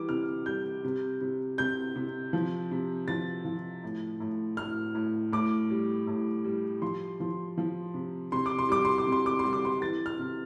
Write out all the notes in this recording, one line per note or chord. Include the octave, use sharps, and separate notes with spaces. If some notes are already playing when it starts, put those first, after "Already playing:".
Already playing: E3 G3 D6
C3 F6
G3 G6
C3
C3
C3 G6
C3
F3
C3
F3 A6
F3
A2
A2
A2 F6
A2
A2 D6
G3
A2
G3
F3 C6
F3
F3
C3
C3 C6
D6
C6
G3 D6
C6
D6
C3
C6
D6
G3 C6
D6
C6
E3 A6
F6
C3